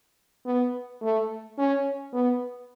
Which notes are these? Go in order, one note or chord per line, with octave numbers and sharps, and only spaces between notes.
B3
A3
C#4
B3